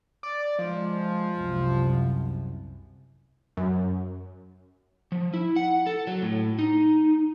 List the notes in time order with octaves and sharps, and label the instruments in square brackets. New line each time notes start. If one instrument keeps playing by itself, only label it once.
[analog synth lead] D5
[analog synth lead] F3 [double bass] G#3
[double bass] C2 F#2
[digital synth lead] F#2
[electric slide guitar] F3
E4
F#5
A4
F#3
A2
D#4